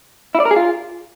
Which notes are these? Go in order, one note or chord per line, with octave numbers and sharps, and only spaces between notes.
E4
D5
A#4
G#4
F4